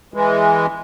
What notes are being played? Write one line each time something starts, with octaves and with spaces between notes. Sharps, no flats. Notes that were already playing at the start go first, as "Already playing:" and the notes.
E3 G#3